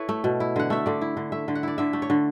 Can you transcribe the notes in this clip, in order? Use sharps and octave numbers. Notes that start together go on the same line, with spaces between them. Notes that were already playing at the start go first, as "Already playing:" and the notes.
Already playing: E4 A4 B4 C#5
A3
B2
E4
D3 F#5
A3 E5
D3 D5
E4
D3
A3 E5
D3
F#5
E4 D5
D3 E5
A3
C#5
D3